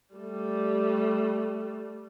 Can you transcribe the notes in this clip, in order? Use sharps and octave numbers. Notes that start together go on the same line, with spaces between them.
G3 A3